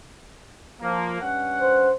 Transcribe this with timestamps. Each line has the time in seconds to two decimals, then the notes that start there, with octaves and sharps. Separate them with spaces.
0.81 F3 A#3
1.21 G2 C#4 F#5
1.61 C5